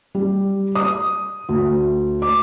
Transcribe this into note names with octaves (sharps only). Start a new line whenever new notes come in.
G3
D#6
D2
D6